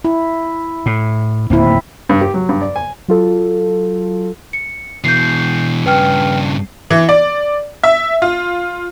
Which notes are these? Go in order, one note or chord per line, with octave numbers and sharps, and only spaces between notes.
E4
A2
D1 D#2 A#3 C4 E4
G2
G4
F#3
G2
D5
G#5
F#3 F4 A4
C#7
B2 E3 G6 C7
G2 C#3 B4 G5 F6
E3
D5
E5
F4